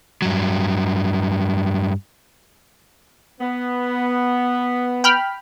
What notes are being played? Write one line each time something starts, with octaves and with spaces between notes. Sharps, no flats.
G2 F#3
B3
G5 B5 F6